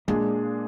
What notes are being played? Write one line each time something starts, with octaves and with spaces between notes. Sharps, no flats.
A#2 G#3 A#3 D4 G#4